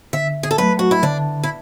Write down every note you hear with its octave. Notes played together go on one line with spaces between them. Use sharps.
D3 E5
G#4
A4
F#3 A3 B4
F#4
E4
D3 D4
E4